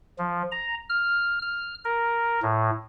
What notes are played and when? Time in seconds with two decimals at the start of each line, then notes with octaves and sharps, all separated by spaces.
0.18 F3
0.51 A#5
0.89 F6
1.42 F6
1.84 A#4
2.42 A2